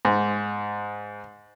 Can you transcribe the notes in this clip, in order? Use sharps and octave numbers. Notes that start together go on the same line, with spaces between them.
G#2